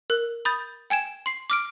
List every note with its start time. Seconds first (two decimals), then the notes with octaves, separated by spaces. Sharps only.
0.10 A#4 F#6
0.45 B5 D#6 G6 A6
0.90 G5 G#5 G#6 E7
1.26 C6 C7
1.50 D6 F6 D7